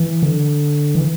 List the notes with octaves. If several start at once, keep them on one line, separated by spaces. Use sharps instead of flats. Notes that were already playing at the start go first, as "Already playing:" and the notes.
Already playing: E3
D3
E3